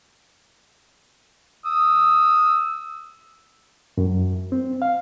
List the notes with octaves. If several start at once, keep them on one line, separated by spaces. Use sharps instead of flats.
D#6 E6
F#2
C4
F5